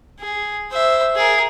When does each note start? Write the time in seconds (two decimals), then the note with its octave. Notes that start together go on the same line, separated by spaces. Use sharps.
0.20 G#4
0.71 C5 E5
1.16 G#4 A#4